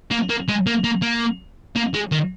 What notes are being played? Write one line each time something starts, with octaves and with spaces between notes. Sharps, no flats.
A#3
A#3
G#3
A#3
A#3
A#3
A#3
G#3
D#3